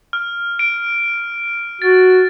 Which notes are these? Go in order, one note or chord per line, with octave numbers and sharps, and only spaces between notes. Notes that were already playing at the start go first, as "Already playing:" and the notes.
F6
D7
F#4 A6